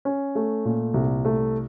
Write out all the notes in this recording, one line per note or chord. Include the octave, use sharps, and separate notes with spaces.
C#4
A3
A#2
C2
A3